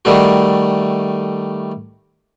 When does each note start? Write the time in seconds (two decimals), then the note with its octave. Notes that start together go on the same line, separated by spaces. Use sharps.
0.05 D#3 G3 A3 F#4